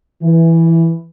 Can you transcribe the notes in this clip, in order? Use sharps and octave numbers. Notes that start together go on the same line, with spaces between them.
E3